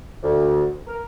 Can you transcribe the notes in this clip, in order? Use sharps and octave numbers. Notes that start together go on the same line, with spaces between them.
D2
A#4